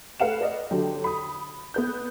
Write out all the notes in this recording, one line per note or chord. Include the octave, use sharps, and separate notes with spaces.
A3 B4 F5 F#5 E7
B4 D5 D#5
D3 F#3 G4
B5 D#6
B3 B4 G6